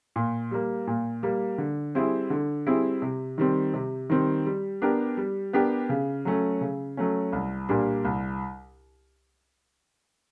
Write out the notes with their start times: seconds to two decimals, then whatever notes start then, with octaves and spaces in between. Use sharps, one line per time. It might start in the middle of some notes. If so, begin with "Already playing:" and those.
0.16 A#2
0.51 G3 A#3
0.87 A#2
1.23 G3 A#3
1.58 D3
1.95 G3 C4 E4 G#4
2.30 D3
2.66 G3 C4 E4 G#4
3.02 C3
3.38 D#3 G3 C4
3.74 C3
4.10 D#3 G3 C4
4.46 G3
4.82 B3 D4 G4 A#4
5.17 G3
5.53 B3 D4 G4 A#4
5.89 C#3
6.25 F#3 A3 C#4
6.61 C#3
6.97 F#3 A3 C#4
7.33 C2
7.69 A#2 G3 A#3 D4
8.05 C2